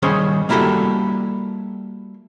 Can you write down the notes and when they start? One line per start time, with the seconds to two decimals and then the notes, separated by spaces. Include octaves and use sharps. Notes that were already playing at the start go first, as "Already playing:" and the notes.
0.02 D#3 G3 C#4 G#4 C5
0.49 G3 A#3 E4 F#4 G4 A4